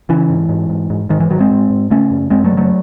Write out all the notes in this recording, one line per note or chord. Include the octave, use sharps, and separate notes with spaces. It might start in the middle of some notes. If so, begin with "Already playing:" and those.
C#3 E3
G#2
G#2
G#2
G#2
G#2 D#3
E3
G#2 D#3 F#3
G#3 C4
G#2
G#2
C#3 A3 C#4
F#2
F#2 G#3 C4
F#3 A3
C#3
F#3 A3